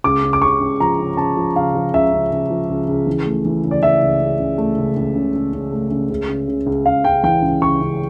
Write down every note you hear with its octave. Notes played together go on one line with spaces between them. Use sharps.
C#2 D6
C#3
D6
C#3 C#6
C#2
F3 A#5
C#3
C#3 A5
F3
C#3 F5
F3
C#2 E5
C#3
C#2
F3
C#2
C#2
E3
A3
E3
C#3
D5
E3 E5
C#2
C#3
C#2
A3
C#2
C#2
C#3
C#3
C#3
A3
C#3
C#2
C#3
C#3
C#2
C#2 F5
C#2 G5
E3 G5
C#2
C#2 C#6
C#2